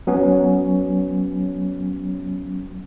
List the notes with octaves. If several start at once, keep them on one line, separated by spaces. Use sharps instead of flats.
F#3 B3 C#4